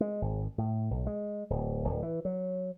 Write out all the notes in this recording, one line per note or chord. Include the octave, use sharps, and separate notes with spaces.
G#3
G#1
A2
B1
G#3
D1
D1
E3
F#3